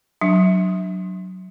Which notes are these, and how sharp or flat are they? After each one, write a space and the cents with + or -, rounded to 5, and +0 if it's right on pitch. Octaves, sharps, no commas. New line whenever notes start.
F#3 +0 D4 +15